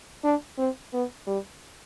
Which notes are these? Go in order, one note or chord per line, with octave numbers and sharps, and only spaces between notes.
D4
C4
B3
G3